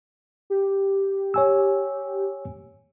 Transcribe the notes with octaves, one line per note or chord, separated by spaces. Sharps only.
G4
C#5 G#5 E6